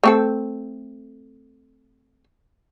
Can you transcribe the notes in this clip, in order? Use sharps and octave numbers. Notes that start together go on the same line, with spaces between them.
A3 C4 A4